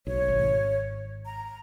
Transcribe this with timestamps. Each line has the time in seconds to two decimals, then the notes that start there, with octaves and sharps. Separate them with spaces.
0.07 B1 C#5
0.28 G#1
1.26 A#5